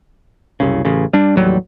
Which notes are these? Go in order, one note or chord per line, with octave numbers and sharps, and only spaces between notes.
F#1 C2 C#3
A1 C#3
G3 D4
A1 D#2 F#3 G3